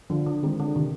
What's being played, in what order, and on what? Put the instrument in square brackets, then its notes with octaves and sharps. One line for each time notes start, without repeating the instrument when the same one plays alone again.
[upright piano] D3 [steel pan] F3
[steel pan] D3
[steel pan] D#3 [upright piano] G#3 C4
[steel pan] D3
[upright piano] C3 [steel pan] D#3